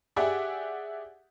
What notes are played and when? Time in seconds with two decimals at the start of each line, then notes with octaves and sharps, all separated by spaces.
0.16 G4 G#4 D5 E5 F#5